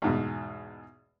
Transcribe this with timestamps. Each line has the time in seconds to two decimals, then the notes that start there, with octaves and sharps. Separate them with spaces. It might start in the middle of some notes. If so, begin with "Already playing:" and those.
0.02 E2 G#2 B2